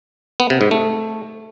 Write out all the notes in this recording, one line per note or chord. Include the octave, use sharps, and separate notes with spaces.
B3
C3
G#2
A3